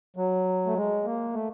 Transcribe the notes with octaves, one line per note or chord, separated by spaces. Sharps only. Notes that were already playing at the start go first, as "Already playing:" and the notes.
F#3
A3
G#3
A#3
A3